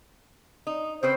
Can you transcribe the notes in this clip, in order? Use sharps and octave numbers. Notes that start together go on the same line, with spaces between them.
D#4
C#3 C4 B4 C5